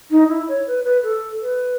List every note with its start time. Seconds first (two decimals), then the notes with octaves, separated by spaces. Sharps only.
0.11 D#4
0.29 E4
0.48 C#5
0.67 B4
0.84 B4
1.03 A4
1.41 B4